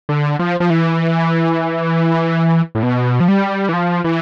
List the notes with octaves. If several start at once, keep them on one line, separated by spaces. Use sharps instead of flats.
D3
F3
F3
E3
A2
B2
F3
G3
E3
F3
E3